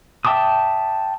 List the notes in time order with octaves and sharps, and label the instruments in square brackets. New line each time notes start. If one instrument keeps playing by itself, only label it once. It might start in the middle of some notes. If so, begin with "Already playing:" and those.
[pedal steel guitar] E5 G5 A5 D6 D#6